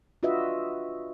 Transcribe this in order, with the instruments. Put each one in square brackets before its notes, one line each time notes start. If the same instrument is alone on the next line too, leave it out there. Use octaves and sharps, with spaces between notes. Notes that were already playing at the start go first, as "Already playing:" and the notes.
[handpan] D4 F4 F#4 B4 D#5 E5